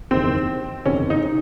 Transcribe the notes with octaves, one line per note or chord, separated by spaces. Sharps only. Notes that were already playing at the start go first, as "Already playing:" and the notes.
F#1 E2 C3 D#3 C4
F#1 E2 C3 D#3 C#4
D#4